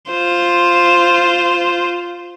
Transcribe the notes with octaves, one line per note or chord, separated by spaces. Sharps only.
F4 C5